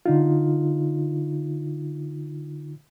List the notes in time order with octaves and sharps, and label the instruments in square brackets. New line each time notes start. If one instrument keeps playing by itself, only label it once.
[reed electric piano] D3 D#4 F4